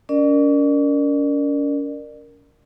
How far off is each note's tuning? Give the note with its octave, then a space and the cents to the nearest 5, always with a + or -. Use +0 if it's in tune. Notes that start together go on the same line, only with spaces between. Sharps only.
C#4 +40 A#4 +0 D5 +35